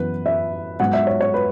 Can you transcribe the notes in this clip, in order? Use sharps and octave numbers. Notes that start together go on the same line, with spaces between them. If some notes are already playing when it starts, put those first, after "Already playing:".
Already playing: F#2 E3 B3 B4
E5
G#2 F#3 B3 F#5
E5
C#5
C#5
B4